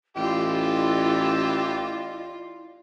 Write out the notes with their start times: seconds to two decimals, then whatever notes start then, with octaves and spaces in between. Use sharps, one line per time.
0.17 A1 E3 E4 F4 G4 A4 D5 D#5